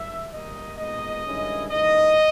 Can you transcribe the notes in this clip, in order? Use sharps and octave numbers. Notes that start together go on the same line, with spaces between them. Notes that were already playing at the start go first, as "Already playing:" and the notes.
Already playing: G#2 D#3 G3 E5
D#3 G3 A#3 D#4 D#5
A#2 G#3 B3 D#4 D#5
G2 D#3 G#3 C#4 E4
G#2 E3 A#3 D#4 D#5